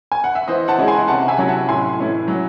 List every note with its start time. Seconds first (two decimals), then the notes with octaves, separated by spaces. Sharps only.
0.12 G#5
0.24 F#5
0.35 E5
0.48 E3 C5 D#5
0.68 F#5 A5
0.79 G#3 C#4 E4
0.88 G#5 C6
1.08 C3 F#5 A5
1.28 E5 G#5
1.38 F#3 C#4 E4
1.48 F#5 A5
1.68 A2 G#5 C6
1.98 E3 A3 C#4 E4
2.28 F#3